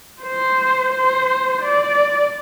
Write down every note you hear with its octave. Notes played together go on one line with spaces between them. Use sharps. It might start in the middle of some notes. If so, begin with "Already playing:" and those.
C5
C5
D5